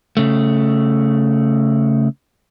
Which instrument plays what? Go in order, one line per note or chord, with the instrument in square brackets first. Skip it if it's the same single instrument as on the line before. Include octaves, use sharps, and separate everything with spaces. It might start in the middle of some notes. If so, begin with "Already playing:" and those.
[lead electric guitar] C#3 A3